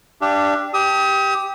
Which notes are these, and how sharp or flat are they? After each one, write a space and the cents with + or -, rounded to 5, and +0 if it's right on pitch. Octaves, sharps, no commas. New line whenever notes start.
D4 +0 G4 +0 F5 -45
G4 +0 D#6 +35